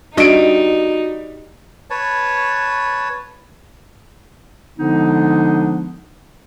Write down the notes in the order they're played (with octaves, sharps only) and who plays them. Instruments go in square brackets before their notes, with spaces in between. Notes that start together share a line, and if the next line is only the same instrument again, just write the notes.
[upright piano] G3 D7 [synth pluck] D4 D#5 E5 [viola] D#4 [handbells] F#4
[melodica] B4 C#5 A5
[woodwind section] D3 F3 G#3 B3 D4 D#4